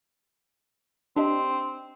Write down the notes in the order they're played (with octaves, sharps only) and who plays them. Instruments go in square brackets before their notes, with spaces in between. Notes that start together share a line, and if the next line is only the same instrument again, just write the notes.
[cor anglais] C4 [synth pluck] D4 G4 D#5